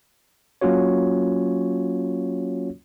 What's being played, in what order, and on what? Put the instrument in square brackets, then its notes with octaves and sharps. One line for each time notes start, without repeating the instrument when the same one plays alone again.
[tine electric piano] F#3 A#3 C#4 F4 F#4 C#5